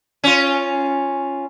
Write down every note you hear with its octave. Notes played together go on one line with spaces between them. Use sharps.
C#4 F4